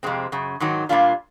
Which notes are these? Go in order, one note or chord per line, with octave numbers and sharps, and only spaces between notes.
F2 C3 D#3 G#3 C4
F#2 C#3
G#2 D#3 F#3
A#2 G3 A#3 D4 F4